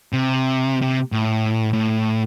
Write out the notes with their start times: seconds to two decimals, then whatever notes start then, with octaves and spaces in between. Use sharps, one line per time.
0.13 C3
0.82 C3
1.12 A2
1.74 A2